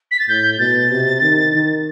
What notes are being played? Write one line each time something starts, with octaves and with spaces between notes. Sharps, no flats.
B6
A6
A2 G6
B2 A6
C3
D#3
D#3